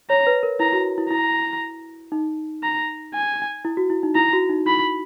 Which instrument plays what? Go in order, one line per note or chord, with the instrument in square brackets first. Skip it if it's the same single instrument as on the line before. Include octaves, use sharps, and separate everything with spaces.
[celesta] C#5 [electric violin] A#5
[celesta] B4
A#4
[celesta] E4 [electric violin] A#5
[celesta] F#4
E4
[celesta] E4 [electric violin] A#5
[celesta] D#4
[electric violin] A#5
G#5
[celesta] E4
F#4
E4
D#4
[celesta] E4 [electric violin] A#5
[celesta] F#4
D#4
[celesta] E4 [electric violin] B5